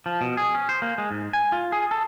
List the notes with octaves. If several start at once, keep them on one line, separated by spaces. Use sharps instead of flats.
F3
B2
G#4
C#4
C5
A#3
G#3
G#2
G#5
F4
G#4
A4